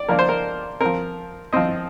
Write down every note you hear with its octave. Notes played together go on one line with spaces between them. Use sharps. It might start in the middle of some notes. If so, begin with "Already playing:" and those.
Already playing: D5
F3 A#3 D4 A#4
C5
A#4
F3 C4 A#4
F3 C4 D#5